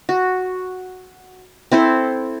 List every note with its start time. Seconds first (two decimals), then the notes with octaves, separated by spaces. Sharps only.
0.09 F#4
1.72 C4 E4 A4 C5